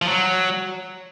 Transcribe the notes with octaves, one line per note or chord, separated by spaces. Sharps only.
F3
F#3